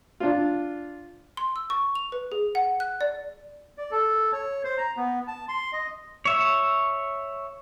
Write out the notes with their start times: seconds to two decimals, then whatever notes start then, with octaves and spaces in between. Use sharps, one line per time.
0.20 D4 F4
1.37 C6
1.56 E6
1.70 C#6
1.95 F7
2.12 B4
2.32 G#4
2.55 F#5
2.80 F#6
3.01 D5
3.77 D5
3.91 A4
4.33 C#5
4.64 C5
4.78 A#5
4.97 B3
5.28 A5
5.48 C6
5.73 D#5
6.25 C#5 E5